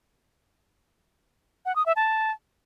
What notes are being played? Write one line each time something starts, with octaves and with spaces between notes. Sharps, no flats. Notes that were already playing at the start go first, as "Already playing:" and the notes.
F#5
D#6
E5
A5